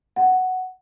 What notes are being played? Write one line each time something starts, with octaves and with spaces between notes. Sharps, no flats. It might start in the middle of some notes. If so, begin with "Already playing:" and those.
F#5